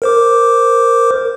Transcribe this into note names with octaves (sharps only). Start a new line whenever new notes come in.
A#4 C5 D6